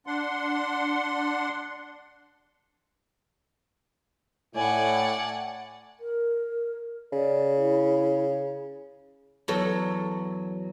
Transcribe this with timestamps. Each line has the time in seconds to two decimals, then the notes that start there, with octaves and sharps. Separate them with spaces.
0.07 D4 F#5 C6
4.55 A2 D5 F#5 G#5
6.00 A#4
7.12 C#3 D5
7.57 E4
9.48 E2 F#3 A4